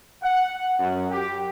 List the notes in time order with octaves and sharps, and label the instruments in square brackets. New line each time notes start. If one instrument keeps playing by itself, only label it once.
[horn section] F#5
F#2
G4